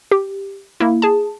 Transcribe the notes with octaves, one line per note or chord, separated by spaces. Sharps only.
G4
A#3 E4
G#4 A5